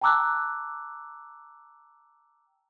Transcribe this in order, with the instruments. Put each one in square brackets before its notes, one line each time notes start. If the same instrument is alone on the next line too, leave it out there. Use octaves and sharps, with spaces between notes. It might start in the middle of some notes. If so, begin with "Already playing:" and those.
[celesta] G5 A5 A#5 D6 E6 F#6